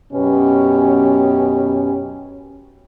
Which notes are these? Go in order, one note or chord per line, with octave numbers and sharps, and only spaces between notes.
F#2 B2 B3 C#4 G4